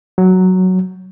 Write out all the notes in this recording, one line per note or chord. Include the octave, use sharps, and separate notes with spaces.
F#3